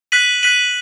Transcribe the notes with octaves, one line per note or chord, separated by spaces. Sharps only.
F#6 B6 D#7 F#7
F#6 B6 D#7 F#7